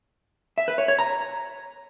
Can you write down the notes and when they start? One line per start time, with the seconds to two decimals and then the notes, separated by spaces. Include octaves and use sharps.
0.58 E5
0.68 B4
0.78 C#5
0.88 C#5
0.99 A#5